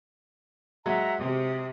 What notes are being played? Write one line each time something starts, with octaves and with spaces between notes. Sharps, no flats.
F#3 G#3 E5 F#5 A#5
C3 D#6